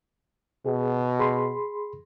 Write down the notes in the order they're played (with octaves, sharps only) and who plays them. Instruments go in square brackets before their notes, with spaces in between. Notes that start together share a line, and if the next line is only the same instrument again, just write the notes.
[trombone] B2 [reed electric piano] G#4
[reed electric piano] G#4 B5 C6